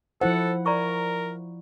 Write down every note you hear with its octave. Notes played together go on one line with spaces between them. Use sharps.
F3 E4 A4 C5 F#5
A#4 D5 A#5 C#6